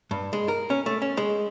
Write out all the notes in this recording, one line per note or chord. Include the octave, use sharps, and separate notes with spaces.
G2
G#3
A#4
C#4
A3
C#4
G#3